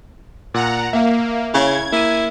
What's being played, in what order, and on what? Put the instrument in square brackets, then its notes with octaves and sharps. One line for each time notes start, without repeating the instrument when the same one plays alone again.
[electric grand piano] A#2 [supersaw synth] F#5 A#5
[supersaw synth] A#3 [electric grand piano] E5 F5
[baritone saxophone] C#3 [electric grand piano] E4 C#5 F5 [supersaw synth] G#6
[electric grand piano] A#3 D#7 [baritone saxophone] E4